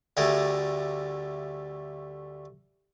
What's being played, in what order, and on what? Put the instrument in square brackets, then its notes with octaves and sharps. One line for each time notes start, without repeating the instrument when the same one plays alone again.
[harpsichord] D2 G3 A3 G#4 A#4